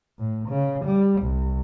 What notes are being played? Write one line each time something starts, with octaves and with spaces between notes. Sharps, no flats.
A2
C#3
G3
C2